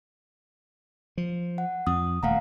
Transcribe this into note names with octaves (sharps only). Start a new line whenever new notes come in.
F3
F#5
F2 D#6
D#1 A3 F5 F#5 A#5